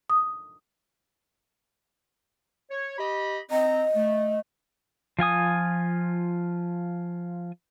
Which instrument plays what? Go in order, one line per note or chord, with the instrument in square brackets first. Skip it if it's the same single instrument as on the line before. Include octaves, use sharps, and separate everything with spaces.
[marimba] D#6
[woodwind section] C#5
G4 D#5 B5
[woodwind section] C4 A#5 [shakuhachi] D#5
[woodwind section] A3
[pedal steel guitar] F3 F4 G#5 D#6